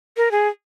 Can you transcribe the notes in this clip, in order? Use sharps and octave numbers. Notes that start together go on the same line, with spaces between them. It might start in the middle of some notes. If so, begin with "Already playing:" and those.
A#4
G#4